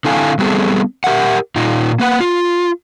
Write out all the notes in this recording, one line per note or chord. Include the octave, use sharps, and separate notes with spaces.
D3 C4 E4 A4 F5 G#5
G3 B3 C4 F#4 G#4 A4
G4 A#4 E5 F#5
A#2 D#4 F4
A#3 B4 F#5
F4